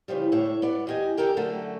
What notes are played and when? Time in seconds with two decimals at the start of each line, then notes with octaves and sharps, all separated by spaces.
0.08 C#3 E3 F3 G3
0.32 A2 D3 C#5 E5
0.62 B3 D5 F#5
0.87 E2 F#4 G4 D#5 G#5
1.17 D3 G4 A4 A#4 G5
1.37 F#2 D3 A3 F#4